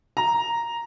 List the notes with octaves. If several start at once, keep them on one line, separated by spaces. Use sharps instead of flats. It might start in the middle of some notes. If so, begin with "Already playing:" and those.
A#5